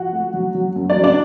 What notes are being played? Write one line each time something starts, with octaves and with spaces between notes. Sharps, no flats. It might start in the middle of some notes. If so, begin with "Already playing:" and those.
Already playing: F3 F#4 F#5
A3
F#3
F#3
F#2
D4 D5
F#3
D4 D5